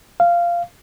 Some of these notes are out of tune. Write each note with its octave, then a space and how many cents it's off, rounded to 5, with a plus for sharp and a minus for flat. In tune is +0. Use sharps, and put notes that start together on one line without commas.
F5 -10